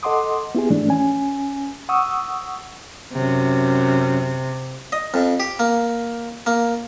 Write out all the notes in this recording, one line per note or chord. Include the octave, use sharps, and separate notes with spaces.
A4 D#5 F#5 C6 D6 D#6
B3 E4 G4 G#4
G#2 E3 A3 D4
C#4 G#5
F#5 C#6 D#6 E6
F#2 C3
D#5
F2
G4
A#3
A#3